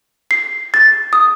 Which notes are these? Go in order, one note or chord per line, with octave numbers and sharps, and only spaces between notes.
C7
A6
D#6